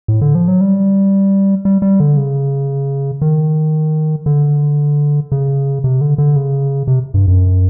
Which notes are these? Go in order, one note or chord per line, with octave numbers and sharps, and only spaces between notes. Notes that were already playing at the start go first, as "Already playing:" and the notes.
A2
D3
F3
F#3
G3
G3
G3
D3
C#3
D#3
D3
C#3
C3
D3
D3
C#3
C3
G2
F#2